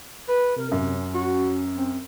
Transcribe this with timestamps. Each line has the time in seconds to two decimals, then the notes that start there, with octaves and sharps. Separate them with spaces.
0.29 B4
0.56 C3 A#4
0.72 F#2 C#4
1.14 F#4
1.77 C4